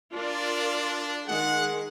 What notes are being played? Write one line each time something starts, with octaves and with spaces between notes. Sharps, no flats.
D4 F4 A#4 D5
D#3 G#3 G#4 F#5